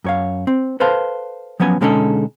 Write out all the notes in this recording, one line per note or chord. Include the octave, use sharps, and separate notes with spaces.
F#2 C#5 F5
C4
A4 B4 C5 F5 A5
F3 F#3 B3 C#4 G#5
B2 D3 G#3 C#4 D#4 A4